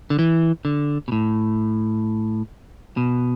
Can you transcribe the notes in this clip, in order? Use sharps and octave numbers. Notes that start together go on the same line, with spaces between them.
D3
E3
D3
B2
A2
B2